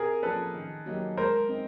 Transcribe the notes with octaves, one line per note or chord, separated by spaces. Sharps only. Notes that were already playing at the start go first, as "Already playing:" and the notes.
Already playing: C3 G#4 A#4
F3 A#3 C#4 A4 B4
D#3
F#3 A#3 D#4 G4
G#3 A#4 C5
C4 D#4